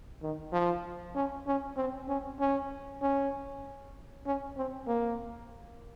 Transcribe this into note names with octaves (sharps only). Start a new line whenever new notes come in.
D#3
F3
C#4
C#4
C4
C#4
C#4
C#4
C#4
C4
A#3